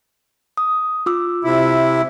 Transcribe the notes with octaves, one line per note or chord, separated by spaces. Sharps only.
D#6
F4 D6 E6
C3 E4